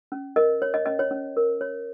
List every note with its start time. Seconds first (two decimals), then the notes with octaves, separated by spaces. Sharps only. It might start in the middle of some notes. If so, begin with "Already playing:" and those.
0.12 C#4
0.36 A#4 D#5
0.62 C#5
0.74 D#5
0.86 C#4 D#5
0.99 C#5
1.11 C#4
1.37 A#4
1.61 C#5